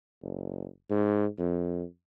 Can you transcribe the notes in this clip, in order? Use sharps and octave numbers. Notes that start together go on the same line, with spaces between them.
F#1
G#2
F2